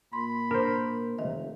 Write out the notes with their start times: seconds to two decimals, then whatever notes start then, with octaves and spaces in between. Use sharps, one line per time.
0.13 A#2 B5 C6
0.51 D4 A#4 C5
1.18 F1 D#3 D#5 E5